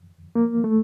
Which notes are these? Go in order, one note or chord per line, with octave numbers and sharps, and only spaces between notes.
A#3
A3